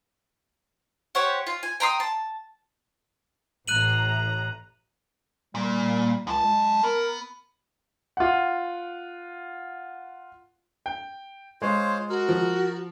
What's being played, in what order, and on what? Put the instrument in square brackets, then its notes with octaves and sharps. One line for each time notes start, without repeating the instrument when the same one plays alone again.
[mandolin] G4 C5 C#5 F#5
F4
G#5
G5 A#5 C6 D#6
A5
[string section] A1 A2 A#5 [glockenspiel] F#6 D#7 F#7
[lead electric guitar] A#2 [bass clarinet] G3
[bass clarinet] C#2 [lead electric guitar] F#2 A5
[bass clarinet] G#3
[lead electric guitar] B3 [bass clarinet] A#4
[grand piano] F4 F#5
[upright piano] G5
[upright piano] G#3 [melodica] F4 C5 C#5
[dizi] F#4 [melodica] A#4
[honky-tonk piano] F3